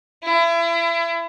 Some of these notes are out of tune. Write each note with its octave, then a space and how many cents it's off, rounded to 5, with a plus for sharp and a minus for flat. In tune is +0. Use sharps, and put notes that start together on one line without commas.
E4 +35